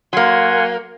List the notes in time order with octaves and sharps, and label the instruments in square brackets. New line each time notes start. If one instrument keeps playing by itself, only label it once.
[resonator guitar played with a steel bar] F#3 A#3 [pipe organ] F#5 G#5 C6